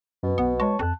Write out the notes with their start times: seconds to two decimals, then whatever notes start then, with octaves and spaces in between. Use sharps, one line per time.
0.23 F#2 B2
0.38 B1 B3 F#5
0.60 G#3 C#5 A5 C#6
0.79 F2 A5 F#6